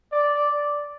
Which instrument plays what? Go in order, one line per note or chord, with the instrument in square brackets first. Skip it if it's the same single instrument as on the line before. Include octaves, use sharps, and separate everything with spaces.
[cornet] D5